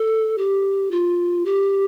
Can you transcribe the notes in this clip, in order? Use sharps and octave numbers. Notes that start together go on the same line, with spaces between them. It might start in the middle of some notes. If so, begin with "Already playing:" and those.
Already playing: A4
G4
F4
G4